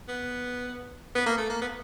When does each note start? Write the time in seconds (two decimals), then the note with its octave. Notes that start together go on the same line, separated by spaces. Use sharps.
0.08 B3
1.15 B3
1.26 A#3
1.38 A3
1.50 A#3
1.61 B3